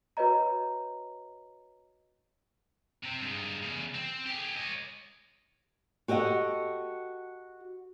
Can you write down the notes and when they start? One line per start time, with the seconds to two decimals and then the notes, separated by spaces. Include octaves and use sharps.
0.17 F#4 B4 C#5 D#5 A#5
3.04 C3 C4
3.22 G2 G#3
3.63 E2 C#3
3.94 C4
4.26 G4 G#4
4.57 C#5 D#5
6.08 F#4 G4 A4 D#5 F#5